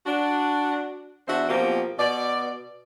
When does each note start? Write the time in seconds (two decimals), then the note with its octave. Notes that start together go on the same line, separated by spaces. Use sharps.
0.06 D4 F#4
1.28 E2 D4 F#4 C5 E5
1.49 B2 F3 A#3 C4 G4
1.99 B2 D5